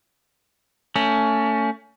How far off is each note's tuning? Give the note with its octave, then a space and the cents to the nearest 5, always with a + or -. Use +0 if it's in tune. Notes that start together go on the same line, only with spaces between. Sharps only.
A3 +25 C#4 +20